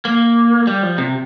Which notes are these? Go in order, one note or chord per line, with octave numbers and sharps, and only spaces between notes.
A#3
G3
F3
C3